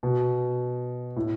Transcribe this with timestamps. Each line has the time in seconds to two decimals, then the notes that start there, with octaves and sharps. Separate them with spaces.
0.03 B2
1.16 A2